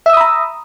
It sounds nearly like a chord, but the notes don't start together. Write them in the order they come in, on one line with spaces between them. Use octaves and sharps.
E5 E6 D#6 B5 A#5